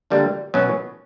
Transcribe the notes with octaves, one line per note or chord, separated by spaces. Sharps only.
D3 G3 A#3 D4
B2 F#3 C#4